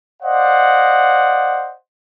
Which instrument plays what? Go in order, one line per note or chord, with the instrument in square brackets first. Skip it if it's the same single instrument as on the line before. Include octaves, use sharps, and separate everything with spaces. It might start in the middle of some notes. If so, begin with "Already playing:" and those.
[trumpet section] C5 D5 D#5 F5 F#5